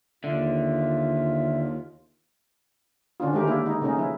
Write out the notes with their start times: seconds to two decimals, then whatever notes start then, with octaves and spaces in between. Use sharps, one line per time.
0.24 D#2 D3 F4 E5
3.20 D3 C#4 D4 F4
3.33 D#3 G#3 A3 G4 A#4
3.47 A#3 D4 E4 G4
3.65 G#3 D#4
3.81 C#3 A3 A#3 C#4 D#4
3.97 F3 E4